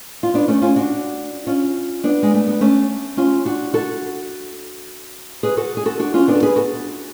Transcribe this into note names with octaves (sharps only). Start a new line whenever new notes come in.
F4
B3 D4
A3 C#4
C#4 F4
D4 F#4
C#4 F4
B3 D4
G#3
A3
B3
A3 C#4
C#4 F4
D4 F#4
F#4 A4
G#4 B4
F#4 A4
G#4
F#4 A4
D4 F#4
C#4 F4
B3 D4
A4
G#4 B4
F#4 A4